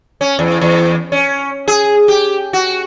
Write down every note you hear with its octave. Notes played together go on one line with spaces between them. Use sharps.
C#4
E2
E2
C#4
G#4
G4
F#4